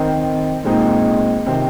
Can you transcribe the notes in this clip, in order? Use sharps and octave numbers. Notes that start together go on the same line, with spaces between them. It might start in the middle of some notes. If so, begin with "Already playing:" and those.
Already playing: D#3 C4 D#4
A#2 G#3 C4 D#4
C3 D#3 C4